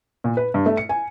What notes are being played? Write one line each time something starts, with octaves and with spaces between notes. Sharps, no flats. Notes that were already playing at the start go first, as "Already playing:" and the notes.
A#2
B4
G2
A3
C#7
G#5